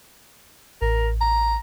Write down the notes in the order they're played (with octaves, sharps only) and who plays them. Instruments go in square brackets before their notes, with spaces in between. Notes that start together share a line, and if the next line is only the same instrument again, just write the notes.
[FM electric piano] A1 [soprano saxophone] A#4
[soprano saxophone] A#5